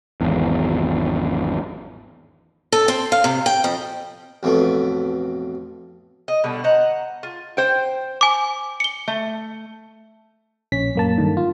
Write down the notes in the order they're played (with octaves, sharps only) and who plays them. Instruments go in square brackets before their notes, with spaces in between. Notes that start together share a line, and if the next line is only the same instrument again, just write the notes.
[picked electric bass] G#1 E2
[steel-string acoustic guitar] A4
C4
F5
C3
G5
F2
[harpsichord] A1 F2 B2 A3
[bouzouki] D#5
B2 D3 G3
C5 D#5 F#5 A#5
F4
[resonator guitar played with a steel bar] C5 G5
[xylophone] G#5 D6
C#7 G7
[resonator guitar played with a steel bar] A3
[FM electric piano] A#1 C#4 B6
F#2 A#3 A5
G2 D3 D#3
F4